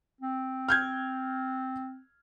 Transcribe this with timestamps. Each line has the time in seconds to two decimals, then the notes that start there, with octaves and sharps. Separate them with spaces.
0.21 C4
0.68 F6 G6 G#6